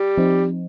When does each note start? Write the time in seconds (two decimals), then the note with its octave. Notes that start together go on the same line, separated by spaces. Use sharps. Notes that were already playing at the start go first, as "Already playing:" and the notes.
Already playing: G3
0.18 F3 C4 D#4